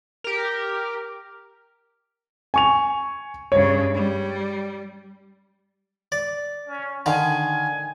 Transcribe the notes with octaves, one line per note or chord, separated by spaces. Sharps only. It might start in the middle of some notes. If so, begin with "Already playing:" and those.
G4 A#4
G#5 C#6 F7
G2 C#3 C#5
G3
D5
C#4
D3 D#3 F5 G#5